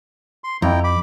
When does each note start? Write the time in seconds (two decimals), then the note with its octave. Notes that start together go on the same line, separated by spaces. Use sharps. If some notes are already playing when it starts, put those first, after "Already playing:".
0.44 C6
0.62 F2 E4 G5 A#5
0.84 B5 D6